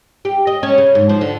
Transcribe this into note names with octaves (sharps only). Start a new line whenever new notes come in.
G4
D#5
C#4
C#3
G#2
F3
D3